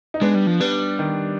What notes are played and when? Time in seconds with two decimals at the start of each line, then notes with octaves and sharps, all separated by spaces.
0.14 D#4
0.21 G#3 B3 D4
0.35 G3
0.47 F3
0.60 G3 B3 D4
0.99 D#3